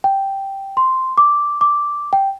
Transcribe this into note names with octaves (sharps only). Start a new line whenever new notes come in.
G5
C6
D6
D6
G5